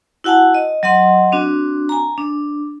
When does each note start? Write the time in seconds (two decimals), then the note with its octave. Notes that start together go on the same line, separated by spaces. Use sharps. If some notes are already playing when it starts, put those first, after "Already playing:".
0.24 E4 F#4 F#5 G#5 A5
0.54 D#5
0.83 F#3 D#5 F#5 C6
1.32 C4 D4 F#4
1.89 G#5 A#5
2.18 D4